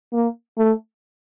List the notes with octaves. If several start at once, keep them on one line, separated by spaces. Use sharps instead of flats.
A#3
A3